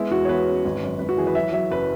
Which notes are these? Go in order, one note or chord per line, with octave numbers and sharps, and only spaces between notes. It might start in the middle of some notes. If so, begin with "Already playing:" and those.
Already playing: G#3 B3 E4
E2 F#4
C#5
E2 B4
C#4
G#1
F#2
G#1 B4
F#4
E3 G#4
B4
F#3 E5
F#3 E5
F#1 B4